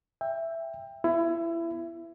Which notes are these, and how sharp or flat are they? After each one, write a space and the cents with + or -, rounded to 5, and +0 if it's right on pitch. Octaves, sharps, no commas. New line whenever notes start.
E5 +10 G5 +20
B3 +0 E4 +25